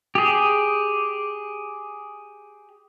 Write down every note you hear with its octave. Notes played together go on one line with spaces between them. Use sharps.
G4 G#4